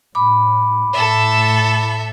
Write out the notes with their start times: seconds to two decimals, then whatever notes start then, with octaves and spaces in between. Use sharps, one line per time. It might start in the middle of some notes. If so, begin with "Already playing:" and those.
0.15 A2 B5 D6
0.93 A2 A4 E5